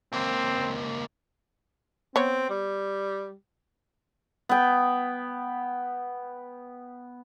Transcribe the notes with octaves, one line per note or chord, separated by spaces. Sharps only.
C#2 A#3 C4
B3 C4 C#5
G3
B3 G5